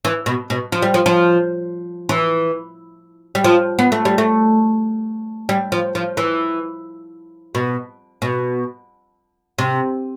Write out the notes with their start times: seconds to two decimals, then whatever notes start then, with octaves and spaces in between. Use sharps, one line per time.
0.05 E3
0.26 B2
0.50 B2
0.72 F3
0.82 G3
0.94 F3
1.06 F3
2.09 E3
3.35 G3
3.44 F3
3.79 B3
3.92 A3
4.05 G3
4.18 A3
5.49 G3
5.72 F3
5.95 F3
6.17 E3
7.55 B2
8.22 B2
9.59 C3